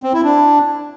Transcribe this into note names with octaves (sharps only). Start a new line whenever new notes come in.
C4
E4
D4